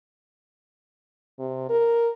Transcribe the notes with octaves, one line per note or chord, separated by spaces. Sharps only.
C3
A#4